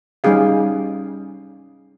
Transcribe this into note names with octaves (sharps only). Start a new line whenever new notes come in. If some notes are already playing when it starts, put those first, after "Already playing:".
G3 C#4 D#4 G#4 F5